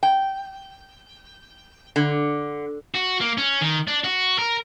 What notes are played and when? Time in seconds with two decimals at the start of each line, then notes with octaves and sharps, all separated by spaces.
0.03 G5
1.96 D3
2.94 F#4
3.20 A#3
3.38 C#4
3.61 D#3
3.87 D4
4.04 F#4
4.39 A#4